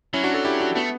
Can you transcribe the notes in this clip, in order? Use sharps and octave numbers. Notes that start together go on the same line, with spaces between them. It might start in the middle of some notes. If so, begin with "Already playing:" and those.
F#3 C#4 E4
D4 F#4
F#4 A4
E4 G4
D4 F#4
A3 B3